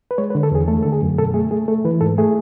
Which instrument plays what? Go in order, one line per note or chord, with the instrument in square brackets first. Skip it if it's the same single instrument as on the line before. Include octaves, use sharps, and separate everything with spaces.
[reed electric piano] B4
G#3 C#5
B4
D3
A4
E2 G#4
A3 A4
D3 A4
G#4
F#2
B2 A4
A3 G#4
A3 G#4
A3 A4
E3 B4
G#2 A4
A3 G#4